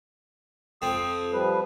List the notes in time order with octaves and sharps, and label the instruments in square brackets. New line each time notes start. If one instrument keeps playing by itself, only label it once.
[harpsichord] F2 C4 [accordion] D#6
[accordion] F3 G3 B4